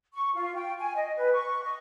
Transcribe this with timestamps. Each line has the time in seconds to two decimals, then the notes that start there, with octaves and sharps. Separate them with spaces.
0.13 C#6
0.34 F4
0.55 G5
0.80 G#5
0.95 D#5
1.17 B4
1.33 C#6
1.63 D#5